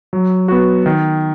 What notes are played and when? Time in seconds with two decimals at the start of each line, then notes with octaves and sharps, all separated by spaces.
0.13 F#3
0.48 B3 F#4
0.86 D#3